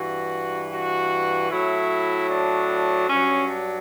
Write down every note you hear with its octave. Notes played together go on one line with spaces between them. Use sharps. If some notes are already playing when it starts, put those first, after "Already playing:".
Already playing: G2 E3 F#4
F#4
A2 F#3 E4
D4
G2 F#3 C#4
D4